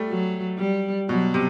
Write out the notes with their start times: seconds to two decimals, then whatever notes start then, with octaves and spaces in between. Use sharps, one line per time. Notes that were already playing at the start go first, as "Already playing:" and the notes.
Already playing: G3 A3
0.09 F#3
0.58 G3
1.09 B2 F#3
1.34 C3